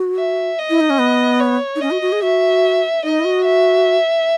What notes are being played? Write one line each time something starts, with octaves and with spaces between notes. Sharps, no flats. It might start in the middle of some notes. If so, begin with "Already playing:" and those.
Already playing: F#4
E5
D#5
E4
D#4
C#4
B3
C#5
D#4
C#4 D#5
F#4
F#4
G#4
F#4 E5
D#4 D#5
E4
F#4
E5